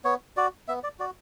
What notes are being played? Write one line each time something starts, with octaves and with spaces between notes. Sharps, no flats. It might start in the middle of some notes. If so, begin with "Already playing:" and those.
B3 C#5
F#4 D5
B3 E5
D5
F#4 D5